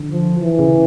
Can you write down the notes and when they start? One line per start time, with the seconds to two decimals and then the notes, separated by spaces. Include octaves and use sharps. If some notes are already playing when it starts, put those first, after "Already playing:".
Already playing: D3
0.11 F3
0.40 E3
0.59 C#3